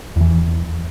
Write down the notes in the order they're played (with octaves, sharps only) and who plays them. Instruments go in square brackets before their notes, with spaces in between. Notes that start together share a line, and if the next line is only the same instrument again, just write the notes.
[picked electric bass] E2 E3